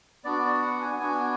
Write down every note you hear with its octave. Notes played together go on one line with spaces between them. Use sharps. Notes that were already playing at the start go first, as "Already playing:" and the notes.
B3 D4 F#4 D5
F#5
G#5
B3 D4 F#4 G#5